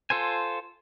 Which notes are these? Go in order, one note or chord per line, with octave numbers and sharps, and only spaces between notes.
F4 A4 C5 G#5